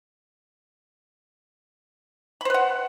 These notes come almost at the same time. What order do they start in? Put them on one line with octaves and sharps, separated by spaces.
B5 C5 B4 F#5